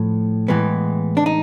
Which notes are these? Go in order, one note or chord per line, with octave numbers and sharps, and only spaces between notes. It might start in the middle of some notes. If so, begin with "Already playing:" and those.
Already playing: A2 F3
A2 E3 G#3 B3
D4
D#4